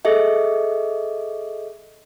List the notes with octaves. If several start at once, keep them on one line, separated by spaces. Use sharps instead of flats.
G#4 A4 D#5 E5